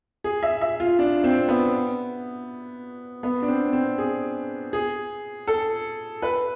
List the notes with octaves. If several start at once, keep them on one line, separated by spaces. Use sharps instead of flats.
G#4
E5
E5
F4
D4
C4
B3
B3
D4
C4
C4
G#4
G#4
A4
B4